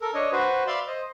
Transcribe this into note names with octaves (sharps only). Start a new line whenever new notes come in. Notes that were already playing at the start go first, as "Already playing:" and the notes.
A4 A#4
D4 C#5 D#5
F#4 B4 C5
D5 E5 F5 B5 C6
C5 D#5